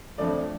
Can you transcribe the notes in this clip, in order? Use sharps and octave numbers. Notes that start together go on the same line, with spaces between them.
F2 D3 F3 A3 D5